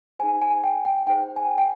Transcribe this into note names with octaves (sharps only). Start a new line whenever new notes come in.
D#4 G#4 C5 G#5
G#5
G5
G5
D#4 G#4 C5 G5
G#5
G5